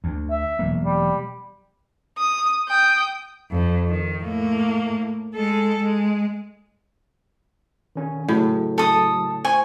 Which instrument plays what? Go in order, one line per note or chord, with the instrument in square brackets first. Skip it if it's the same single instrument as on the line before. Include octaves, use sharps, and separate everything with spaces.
[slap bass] D2
[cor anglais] E5
[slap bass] E1 F#3 A#3
[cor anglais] G3
[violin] D#6
G5 D#6
[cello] F2
D#3
A2 A#3
G#3 A4
G#3
[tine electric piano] D#3 C#4
[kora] A2 [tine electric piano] C#3 F#3
[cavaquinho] A4 D#6
[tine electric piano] C5 C#6 [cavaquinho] G#5